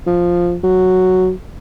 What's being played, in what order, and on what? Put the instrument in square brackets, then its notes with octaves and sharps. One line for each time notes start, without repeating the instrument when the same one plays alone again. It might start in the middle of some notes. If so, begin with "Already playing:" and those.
[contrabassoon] F3
F#3